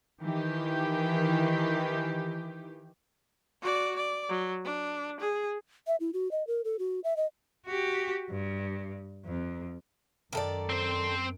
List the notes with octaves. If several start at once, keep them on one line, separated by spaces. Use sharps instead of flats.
D#3 E3 G4
F#4 D5
D5
F#3
D4
G#4
E5
E4
F#4
D#5
A#4
A4
F#4
E5
D#5
F#4 G4
G2
F2
F#2 D#3 A4 D5
C4 C5